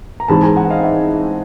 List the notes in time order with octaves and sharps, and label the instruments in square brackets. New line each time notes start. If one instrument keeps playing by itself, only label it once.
[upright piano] A#5
[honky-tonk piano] G#2 E3 G#3 C4 [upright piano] A5 B5
[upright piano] G#5 A#5
F#5 G#5
D#5 F5
E5 F#5